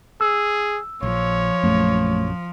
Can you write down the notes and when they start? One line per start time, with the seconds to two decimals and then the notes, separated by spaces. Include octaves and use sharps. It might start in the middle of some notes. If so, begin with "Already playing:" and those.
0.21 G#4 E6
1.03 A#1 F3 C#5
1.64 A#1 F#2 A3